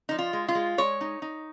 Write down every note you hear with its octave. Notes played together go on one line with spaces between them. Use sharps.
F3 D#4
F4
G#3
F4
G#3
G#3 C#5
D#4
D#4